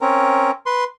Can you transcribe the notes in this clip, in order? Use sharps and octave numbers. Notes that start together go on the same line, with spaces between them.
C4 C#4 A#4
B4 C6